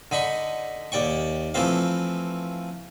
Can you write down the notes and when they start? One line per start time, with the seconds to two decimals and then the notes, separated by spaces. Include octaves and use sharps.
0.11 D3 D#4 B5 C#6
0.92 D#2 D5 G5 C#6
1.54 E3 F3 A3 C4 F5